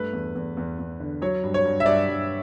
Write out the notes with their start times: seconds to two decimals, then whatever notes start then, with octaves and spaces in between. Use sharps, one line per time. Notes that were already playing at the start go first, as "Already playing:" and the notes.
Already playing: G2 A3 B4
0.13 E2
0.35 E2
0.57 E2
0.79 E2
1.00 D3
1.22 F#3 C#5
1.44 G2
1.54 C#5
1.65 G2
1.80 E5
1.86 G2 D5
2.09 G2